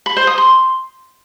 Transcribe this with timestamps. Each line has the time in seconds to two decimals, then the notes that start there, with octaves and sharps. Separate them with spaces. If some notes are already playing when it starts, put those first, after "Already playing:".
0.06 B5
0.17 C5
0.27 D#6
0.38 C6